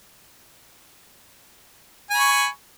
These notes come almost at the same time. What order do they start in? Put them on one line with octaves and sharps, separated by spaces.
G#5 B5 C#6